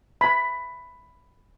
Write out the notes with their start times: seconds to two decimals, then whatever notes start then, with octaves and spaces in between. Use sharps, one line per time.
0.21 B5